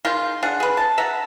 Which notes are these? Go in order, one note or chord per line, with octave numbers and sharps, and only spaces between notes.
D#3 G#3 F4 C6
D4 G#4 F#5
G#4 B4
A5
E5 F#5 A#5